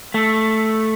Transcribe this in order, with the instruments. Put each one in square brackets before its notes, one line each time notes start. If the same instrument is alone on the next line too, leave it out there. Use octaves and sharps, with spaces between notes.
[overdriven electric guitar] A3